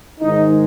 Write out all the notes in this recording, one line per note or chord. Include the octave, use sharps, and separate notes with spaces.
G#2 D#3 G#3 D#4